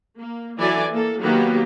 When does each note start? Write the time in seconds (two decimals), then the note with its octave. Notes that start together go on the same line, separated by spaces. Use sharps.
0.19 A#3
0.58 E3 F#3 E4 A4 D5 G#5
0.91 A#3 A4
1.22 D#3 F#3 A#3 B3 D#4 G4